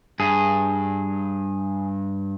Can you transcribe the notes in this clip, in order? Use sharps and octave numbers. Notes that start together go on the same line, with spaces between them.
G2 G#4